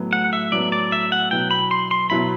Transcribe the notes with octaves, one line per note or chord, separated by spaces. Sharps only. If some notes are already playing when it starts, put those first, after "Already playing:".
Already playing: A2 F#3 B3
F#5
E5
A2 F#3 B3 D5
D5
E5
F#5
B2 F#3 B3 E4 G5
B5
C6
C6
B2 F#3 B3 E4 B5